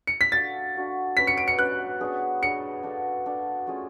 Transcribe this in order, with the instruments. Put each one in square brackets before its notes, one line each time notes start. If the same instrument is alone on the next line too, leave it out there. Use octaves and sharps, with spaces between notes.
[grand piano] C#7
B6
[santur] D4 F#4 A4 F5 [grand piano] A6
[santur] D4 F#4 A4 F5
[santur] C#4 F#4 B4 D5 [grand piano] B6
[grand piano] C#7
D7
C#7
[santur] C#4 F#4 B4 D5 [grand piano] F#6
[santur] B3 D4 G#4 C#5
[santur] B3 D4 G#4 C#5 [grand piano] C#7
[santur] D4 F#4 A4 F5
D4 F#4 A4 F5
A3 C#4 F4 G#4